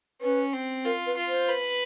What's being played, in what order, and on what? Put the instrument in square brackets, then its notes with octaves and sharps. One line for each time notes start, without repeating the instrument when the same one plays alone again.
[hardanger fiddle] C#4 [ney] B4
[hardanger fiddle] C4
[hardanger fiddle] F4 [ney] A#4
[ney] B4
[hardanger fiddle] F4
[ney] C5
[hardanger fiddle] B4